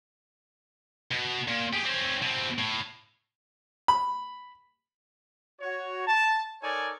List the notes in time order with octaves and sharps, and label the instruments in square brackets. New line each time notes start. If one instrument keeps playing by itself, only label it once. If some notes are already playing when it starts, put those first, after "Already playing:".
[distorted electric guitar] B2
A#2
G4 G#4
C4 C#4
B2 C4
A2
[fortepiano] B5
[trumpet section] F#4 C#5
A5
D#4 A4 A#4 C#5 D5 G#5